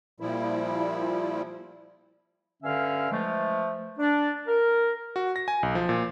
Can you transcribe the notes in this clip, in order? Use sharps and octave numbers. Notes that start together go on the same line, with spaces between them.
A#2 F3 G3 E4
G2 D3 C#4 E5 F5 F6
E3 F3 G#3 A3
D4
A#4
F#4
A#6
G#5
B1
F3
A#2